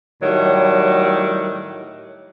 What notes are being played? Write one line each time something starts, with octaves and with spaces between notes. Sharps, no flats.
A2 D#3 F#3 G3